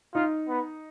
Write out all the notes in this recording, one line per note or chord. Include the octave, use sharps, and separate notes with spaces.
D#4 F4
B3